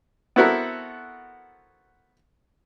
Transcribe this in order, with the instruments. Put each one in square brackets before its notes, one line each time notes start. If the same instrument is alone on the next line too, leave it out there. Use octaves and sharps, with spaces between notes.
[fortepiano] B3 C4 E4 F#4 A4 A#4